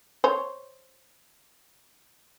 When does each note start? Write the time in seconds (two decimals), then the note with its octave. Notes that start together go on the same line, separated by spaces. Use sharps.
0.24 C5 C#5